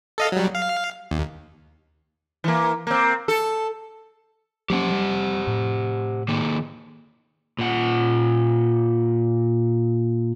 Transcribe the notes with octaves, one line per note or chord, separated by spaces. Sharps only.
A4 D#5 F5
F#3 G3
F5
D#2
E3 A#3
A#3 C4
A4
F#3 A#3 C#4 G4 C5 F#5
G3
A2
D#3 A#3 G#4
A#2 F#5